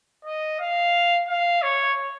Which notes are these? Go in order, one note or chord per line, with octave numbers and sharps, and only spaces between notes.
D#5
F5
F5
C#5